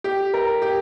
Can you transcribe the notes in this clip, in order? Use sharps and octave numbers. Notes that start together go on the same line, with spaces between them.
G4
A#4
G4